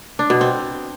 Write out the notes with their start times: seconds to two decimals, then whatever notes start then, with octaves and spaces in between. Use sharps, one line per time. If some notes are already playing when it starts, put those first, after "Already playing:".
0.19 D4
0.30 B2
0.41 C4